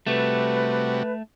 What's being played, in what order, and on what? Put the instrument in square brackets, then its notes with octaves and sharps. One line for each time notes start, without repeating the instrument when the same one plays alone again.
[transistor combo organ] C3 G3 F#4 [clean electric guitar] A3 [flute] B4